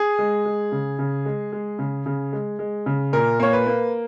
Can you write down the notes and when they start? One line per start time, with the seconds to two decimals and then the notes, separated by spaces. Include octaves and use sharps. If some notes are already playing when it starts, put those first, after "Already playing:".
Already playing: G#4
0.19 G#3
0.46 G#3
0.72 C#3
0.99 C#3
1.26 G#3
1.52 G#3
1.79 C#3
2.06 C#3
2.33 G#3
2.59 G#3
2.86 C#3
3.13 A#2 A#4
3.40 A#3 C#5
3.53 B4
3.66 A#3